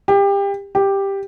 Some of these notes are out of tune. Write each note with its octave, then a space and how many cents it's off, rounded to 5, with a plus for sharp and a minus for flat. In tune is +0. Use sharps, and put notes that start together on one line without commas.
G4 +25
G4 +5